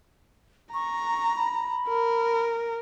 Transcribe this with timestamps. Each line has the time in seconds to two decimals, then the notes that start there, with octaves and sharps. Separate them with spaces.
0.74 A#5 C#6
1.36 B5
1.89 A#4